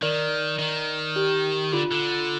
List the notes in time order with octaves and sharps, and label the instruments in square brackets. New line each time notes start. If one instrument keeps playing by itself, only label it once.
[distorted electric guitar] D#3 [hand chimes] A#4 D5
[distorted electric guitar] D#3
[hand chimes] G4
[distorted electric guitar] D3 [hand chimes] F4
[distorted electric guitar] D3